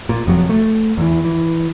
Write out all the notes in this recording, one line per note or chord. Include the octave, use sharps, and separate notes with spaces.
A#2
F1 F2 B2 F#3
A3
E2 E3
E3